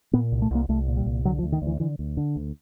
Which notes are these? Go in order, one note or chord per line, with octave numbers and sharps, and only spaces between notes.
A#2 B3
C2
A3
C2 A#3
C2 A3
A#2
G3
C2
D3 F#3
F3
D2
D#3
D2
E3
D3 E3
D2
D3
D2